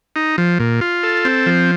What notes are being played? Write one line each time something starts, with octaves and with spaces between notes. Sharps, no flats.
D#4
F3
A#2
F4
A4
C4
F3